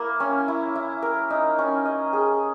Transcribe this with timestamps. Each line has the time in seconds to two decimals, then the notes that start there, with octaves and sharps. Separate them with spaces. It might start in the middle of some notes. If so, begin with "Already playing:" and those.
Already playing: A#3 E4 A#4
0.20 C#4
0.48 E4
0.75 E4
1.02 A#4
1.30 D#4
1.59 C#4
1.85 D#5
2.13 G#4